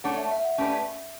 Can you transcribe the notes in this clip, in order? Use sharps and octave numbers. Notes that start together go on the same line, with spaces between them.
A3 D4 A4 C#5 F#5
E5
E5
F#5
A3 C#4 G4 B4 D5